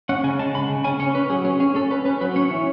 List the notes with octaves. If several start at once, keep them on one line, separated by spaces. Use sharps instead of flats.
C#4 F#5
C#3 G#5
G#3 A5
C#3 B5
C#3
C#4 G#5
C#4 C#5
C#4 B4
F#3 G#4
C#4 G#4
C#4 G#4
C#4 A4
C#4 B4
C#4 B4
F#3 B4
C#4 C#5
E3